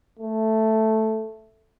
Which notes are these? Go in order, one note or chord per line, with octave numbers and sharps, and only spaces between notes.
A3